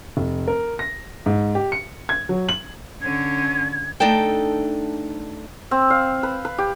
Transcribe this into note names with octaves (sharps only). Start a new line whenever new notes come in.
F1
A#4
A#6
G#2
G4
C#7
G#6
F#3
F#7
D3 C#4 G#6
A3 D4 D#4 A4 G5
C4
F5
B4
B4
G4